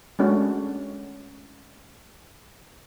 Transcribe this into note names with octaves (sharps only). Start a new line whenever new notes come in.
G#3 A3 C#4 D4 F#4